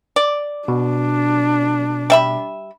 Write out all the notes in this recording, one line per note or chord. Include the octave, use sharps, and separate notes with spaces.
D5
B2 D4
G3 E5 B5